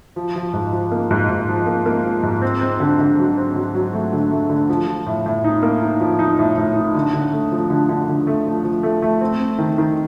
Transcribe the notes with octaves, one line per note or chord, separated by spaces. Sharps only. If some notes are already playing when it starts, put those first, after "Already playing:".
F3
F3
G#2
F3
A#3
G#2
G#2
F3
A#3
A#3
F3
G#2
C4
C4
D3
D3
F#3
C4
F#3
F#3
A3
D3
A3
D3
F3
F3
A2
A2
D#4
A#3
D#4
F3
D#4
A2
A2
D#4
D3
D3
A3
F3
D3
D3
D3
A3
F3
F3
A3
A3
C4
C4
D#3
D#3